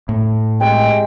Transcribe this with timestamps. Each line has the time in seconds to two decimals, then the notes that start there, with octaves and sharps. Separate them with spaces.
0.09 A2
0.60 C3 G#3 G5